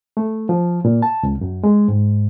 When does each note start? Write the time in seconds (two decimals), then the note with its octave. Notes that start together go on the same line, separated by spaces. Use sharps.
0.17 A3
0.49 F3
0.85 A#2
1.02 A5
1.23 C#2
1.41 F#2
1.64 G#3
1.88 G#2